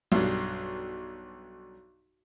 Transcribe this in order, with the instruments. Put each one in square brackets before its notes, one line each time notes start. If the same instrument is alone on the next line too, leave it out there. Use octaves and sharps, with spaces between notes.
[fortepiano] B1 G2